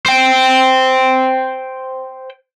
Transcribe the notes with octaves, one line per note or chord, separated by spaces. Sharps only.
C5 G5